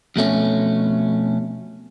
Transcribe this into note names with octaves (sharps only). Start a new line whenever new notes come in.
F2 B2 A3 C#4